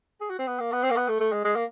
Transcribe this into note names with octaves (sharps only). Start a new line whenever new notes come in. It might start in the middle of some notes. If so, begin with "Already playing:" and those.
G#4
F#4
C4
B3
A#3
B3
C4
A#3
B3
A3
A3
G#3
G#3
A#3